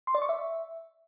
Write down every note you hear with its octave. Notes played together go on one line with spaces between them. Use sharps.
C6
D5
C#6
E5